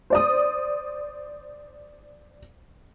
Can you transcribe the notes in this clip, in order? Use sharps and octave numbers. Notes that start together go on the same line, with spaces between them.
C5 D5 D#6